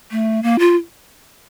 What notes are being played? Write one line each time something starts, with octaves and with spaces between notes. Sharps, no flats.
A3
A#3
F4